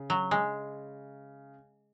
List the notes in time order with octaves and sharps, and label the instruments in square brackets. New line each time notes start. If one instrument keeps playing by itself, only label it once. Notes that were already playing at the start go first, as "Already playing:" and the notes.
Already playing: [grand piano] C#3
[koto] F#3
G#3